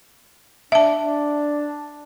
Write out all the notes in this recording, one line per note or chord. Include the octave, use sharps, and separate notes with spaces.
D4 E5 A5
D4